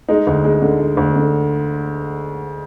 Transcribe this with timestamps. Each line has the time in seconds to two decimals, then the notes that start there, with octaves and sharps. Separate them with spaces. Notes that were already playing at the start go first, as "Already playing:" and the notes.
0.09 G#3 D#4
0.27 D2
0.44 G#3
0.62 D3
0.80 D3
0.97 D2
1.16 D3